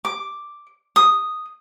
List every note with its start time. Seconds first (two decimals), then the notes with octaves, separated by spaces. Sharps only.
0.05 D6
0.96 D#6